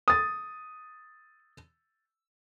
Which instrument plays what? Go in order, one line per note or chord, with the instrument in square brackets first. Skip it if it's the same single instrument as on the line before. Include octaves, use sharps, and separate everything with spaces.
[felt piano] D#6 A6